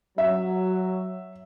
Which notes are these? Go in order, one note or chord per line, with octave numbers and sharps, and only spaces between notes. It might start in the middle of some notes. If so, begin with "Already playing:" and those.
F#3 E5